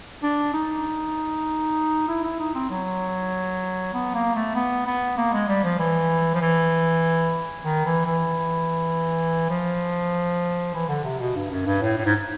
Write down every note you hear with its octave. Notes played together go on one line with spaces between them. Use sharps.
D4
D#4
E4
E4
D#4
C4
F#3
B3
A#3
A3
B3
B3
A#3
G#3
G3
F3
E3
F3
E3
D#3
E3
E3
F3
E3
D3
C3
B2
G2
F#2
G2
A2
A2
G#2